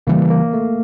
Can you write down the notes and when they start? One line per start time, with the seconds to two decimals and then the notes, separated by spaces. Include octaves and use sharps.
0.07 C#3 E3 G3 A#3
0.30 A#3
0.53 A3